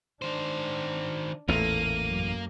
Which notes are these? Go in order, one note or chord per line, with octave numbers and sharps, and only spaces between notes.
D#3 D4 C5
A1 E2 A#2 A3 A#3 D#7
F#2